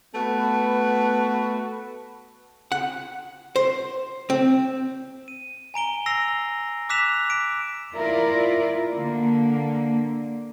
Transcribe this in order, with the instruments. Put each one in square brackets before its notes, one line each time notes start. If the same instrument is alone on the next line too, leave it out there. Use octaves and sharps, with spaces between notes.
[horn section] A3 B3 F#4 B4
[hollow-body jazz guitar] F#5
C5
C4
[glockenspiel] D#7
G#5 A#5 D7 G7
E6 A#6 C7 F7
D6 E6 F#6 B6 E7 F7
B6 D7
[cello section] E4 F4 A#4 D5
D3 A#3